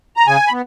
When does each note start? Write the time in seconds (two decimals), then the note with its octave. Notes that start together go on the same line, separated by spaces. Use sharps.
0.17 A#5
0.27 C#3 G#5
0.48 B5
0.52 B3